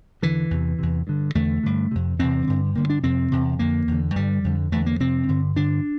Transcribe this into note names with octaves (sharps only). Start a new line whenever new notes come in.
E2 D3 E3
E2 C3
E2 C3
G2 D3
E2 D3 A3
G2 D3
F2 C3
E2 C3 C4
G2 D3
G2 D3 A#3
D4
F2 C3 C4
E2 C3
F2 D3 A#3
E2 D3
G2 D3 G3
F2 D3
E2 D3 A3
A#3
F2 C3 C4
G2 D3
G2 D3 D4